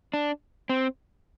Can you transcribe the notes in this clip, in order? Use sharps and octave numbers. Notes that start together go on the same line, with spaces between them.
D4
C4